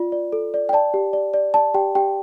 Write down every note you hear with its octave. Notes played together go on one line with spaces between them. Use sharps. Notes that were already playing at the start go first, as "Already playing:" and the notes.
Already playing: F4 D5
D5
A4
D5
G5
D5 A5
G4
D5
D5
D5 A5
G4 G5
G4 G5